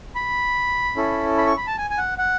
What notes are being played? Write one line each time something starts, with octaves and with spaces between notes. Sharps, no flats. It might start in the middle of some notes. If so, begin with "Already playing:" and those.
B5
C#4 E4 A4
B5
C#6
B5
A5
G#5
G#5
F#5
F#5